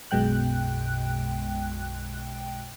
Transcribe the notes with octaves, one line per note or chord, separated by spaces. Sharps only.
B1 F#2 B2 G#3 G5 F#6